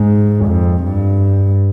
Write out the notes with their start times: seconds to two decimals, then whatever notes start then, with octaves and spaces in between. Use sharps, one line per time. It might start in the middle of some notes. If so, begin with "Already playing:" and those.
Already playing: G#2
0.46 F2
0.84 G2